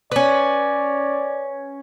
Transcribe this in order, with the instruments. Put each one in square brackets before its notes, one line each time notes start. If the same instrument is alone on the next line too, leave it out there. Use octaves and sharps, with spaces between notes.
[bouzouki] C#4 B4 [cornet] D5